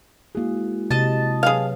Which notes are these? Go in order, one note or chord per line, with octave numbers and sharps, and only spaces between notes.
G#3 A#3 E4 F#4 G#4
C3 D#5 A5
F#3 G#4 B4 C#5 F5